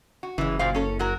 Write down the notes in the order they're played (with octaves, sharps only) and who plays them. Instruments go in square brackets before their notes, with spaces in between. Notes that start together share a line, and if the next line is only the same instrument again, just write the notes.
[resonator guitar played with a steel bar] F#4
[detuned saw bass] F#1 [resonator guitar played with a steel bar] E3 G#3
[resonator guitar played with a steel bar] A#2 C5 F5
C#4 A4 C#5
F#3 F#4 A#4